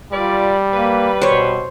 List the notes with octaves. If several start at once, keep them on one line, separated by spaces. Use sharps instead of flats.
G3 F4 A#4 B4 D5
A#3 B4
B2 C5 C#5